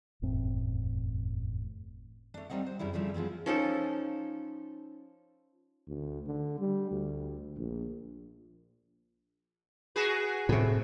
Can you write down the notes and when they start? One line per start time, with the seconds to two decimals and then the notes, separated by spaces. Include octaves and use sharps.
0.22 F#1 E2 A2 C4
2.34 A3 D4
2.49 G3 A3 C4 D#4 F#5
2.66 C5
2.79 F#2 C#3 G3 E4
2.93 C#3 F3 G3 A3 C4
3.14 F3 G#3 B3 C4
3.46 F3 C#4 D#4 A4
5.87 D2
6.27 D3
6.59 G3
6.92 D2
7.57 A#1
9.96 F#4 G#4 B4
10.49 A2 C3